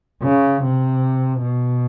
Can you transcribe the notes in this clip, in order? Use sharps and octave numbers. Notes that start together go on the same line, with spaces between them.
C#3
C3
B2